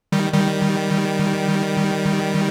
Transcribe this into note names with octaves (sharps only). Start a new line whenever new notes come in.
D#3 G3
D#3 G3